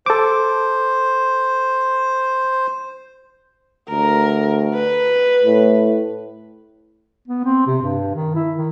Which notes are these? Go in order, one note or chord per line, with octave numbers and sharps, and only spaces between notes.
A4 C5 D6
D2 A#4
B4
A2
B3
C4
C3
G2
D#3
E4
D#3